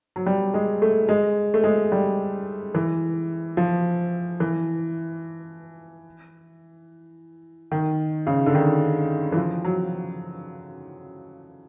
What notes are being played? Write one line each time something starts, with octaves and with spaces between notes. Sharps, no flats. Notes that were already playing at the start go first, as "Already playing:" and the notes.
F#3
G3
G#3
A3
G#3
A3
G#3
G3
E3
F3
E3
D#3
C#3
D3
D#3
E3
F3
F#3